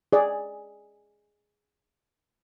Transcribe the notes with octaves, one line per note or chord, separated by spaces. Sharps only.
G#4 D5